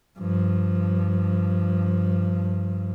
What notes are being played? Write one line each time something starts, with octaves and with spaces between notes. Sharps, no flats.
G2 F3